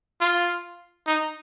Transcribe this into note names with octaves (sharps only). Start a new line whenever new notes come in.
F4
D#4